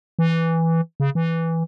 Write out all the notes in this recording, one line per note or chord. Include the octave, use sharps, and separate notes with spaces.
E3
C#3
E3